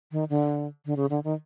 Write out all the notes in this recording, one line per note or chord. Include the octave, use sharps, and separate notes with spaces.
D#3
D3
D3
C#3
D3
D#3